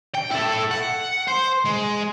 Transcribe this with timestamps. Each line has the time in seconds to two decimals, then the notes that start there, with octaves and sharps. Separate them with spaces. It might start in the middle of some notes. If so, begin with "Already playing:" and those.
0.15 G5
0.31 E4 A4
0.71 F#5
1.28 C5
1.66 G#3